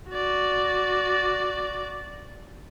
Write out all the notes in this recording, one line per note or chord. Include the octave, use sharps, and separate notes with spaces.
F#4 D5